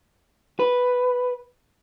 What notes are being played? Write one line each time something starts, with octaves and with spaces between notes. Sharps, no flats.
B4